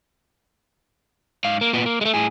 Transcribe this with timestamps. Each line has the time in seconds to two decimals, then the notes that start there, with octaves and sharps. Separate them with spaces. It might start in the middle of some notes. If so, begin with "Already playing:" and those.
1.45 G#2 F5
1.61 A#3
1.73 A#2 B3
1.86 A#3
2.01 G#3 A3
2.14 A2 G#4